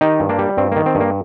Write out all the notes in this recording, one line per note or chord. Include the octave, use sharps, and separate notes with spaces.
D#3 D#4 G4
G2
A#3 D4
G3
G2 C4
D#3 A#3
C4
G2
A#3